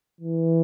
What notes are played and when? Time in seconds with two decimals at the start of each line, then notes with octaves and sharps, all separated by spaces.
0.21 E3